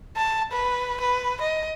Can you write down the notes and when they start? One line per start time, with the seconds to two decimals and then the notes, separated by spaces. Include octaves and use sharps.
0.17 A5
0.52 B4
1.01 B4
1.41 D#5